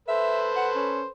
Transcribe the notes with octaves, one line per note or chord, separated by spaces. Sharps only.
A4 B4 C5 E5
F#5
C#4